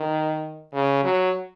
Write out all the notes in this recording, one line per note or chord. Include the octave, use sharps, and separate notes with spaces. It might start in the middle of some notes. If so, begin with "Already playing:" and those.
Already playing: D#3
C#3
F#3